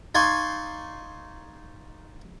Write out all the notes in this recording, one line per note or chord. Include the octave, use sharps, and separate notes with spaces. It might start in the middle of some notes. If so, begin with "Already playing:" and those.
D#4 D5 F5 G#5 C6 C#6